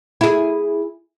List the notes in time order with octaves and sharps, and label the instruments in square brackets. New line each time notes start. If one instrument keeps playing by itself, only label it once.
[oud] E4 G#4